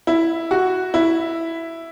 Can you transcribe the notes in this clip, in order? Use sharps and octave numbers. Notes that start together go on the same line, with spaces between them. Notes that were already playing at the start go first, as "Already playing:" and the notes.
E4
F#4
E4